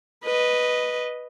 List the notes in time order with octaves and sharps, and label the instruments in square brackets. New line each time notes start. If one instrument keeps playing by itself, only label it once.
[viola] B4 D#5